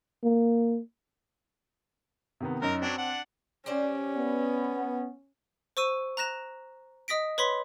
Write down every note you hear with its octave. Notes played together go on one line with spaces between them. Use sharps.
A#3
C3 D#3 B3
F#2 D#4 A#4
F#3 C4 D4
D4 F#5
C#4 G4 C5 D5
B3
C5 C#6 E6 D#7
A#5 F#6 A#6 E7
D#5 D#6 A#6 B6 D7
B4 C#5 B5 C6 B6